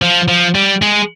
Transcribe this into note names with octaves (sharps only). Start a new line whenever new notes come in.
F3
F3
G3
G#3